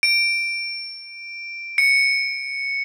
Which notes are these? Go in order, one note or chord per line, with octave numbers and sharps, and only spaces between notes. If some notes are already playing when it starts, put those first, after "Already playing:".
D7
C#7